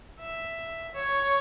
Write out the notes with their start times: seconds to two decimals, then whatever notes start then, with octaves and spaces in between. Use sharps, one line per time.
0.20 E5
0.95 C#5